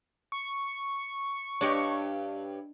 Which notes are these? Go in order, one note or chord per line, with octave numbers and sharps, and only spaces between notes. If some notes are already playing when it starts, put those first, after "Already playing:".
C#6
G2 D4 G4 C#5 D#5